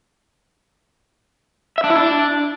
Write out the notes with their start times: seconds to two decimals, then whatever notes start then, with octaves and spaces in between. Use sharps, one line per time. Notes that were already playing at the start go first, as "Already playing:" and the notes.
1.78 E5
1.84 D4
1.90 E4
1.96 D4